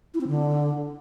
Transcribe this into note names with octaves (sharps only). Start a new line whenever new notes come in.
E4
C4
D3